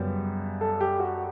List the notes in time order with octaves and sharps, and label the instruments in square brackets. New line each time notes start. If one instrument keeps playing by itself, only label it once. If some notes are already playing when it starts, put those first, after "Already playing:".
Already playing: [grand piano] F#2 C#3 G3 B3
A4
G4
F#4